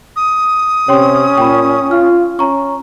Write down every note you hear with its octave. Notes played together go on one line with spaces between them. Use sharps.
D#6
C3 C#4 C#5 G5 C6
A#2 G5 B5
F4 F6
C#4 A#5 C#6